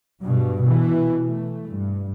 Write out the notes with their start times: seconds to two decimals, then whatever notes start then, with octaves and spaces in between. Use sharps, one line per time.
0.21 G2 B2
0.63 B2 E3
1.29 A3
1.69 G2